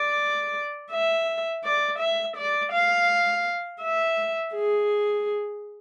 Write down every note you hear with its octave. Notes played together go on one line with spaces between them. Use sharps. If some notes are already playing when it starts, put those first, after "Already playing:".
Already playing: D5
E5
D5
E5
D5
F5
E5
G#4